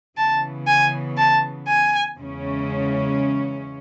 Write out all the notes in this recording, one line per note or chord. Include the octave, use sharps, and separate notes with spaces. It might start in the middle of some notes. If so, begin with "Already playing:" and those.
C#3 E3 B3 A5
G#5
A5
G#5
E2 C#3 G#3 C#4